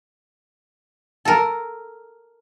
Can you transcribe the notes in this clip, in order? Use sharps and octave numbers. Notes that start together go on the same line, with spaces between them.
A4 A#4